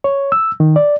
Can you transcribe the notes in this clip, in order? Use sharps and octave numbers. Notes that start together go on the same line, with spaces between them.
C#5
E6
D#3
D5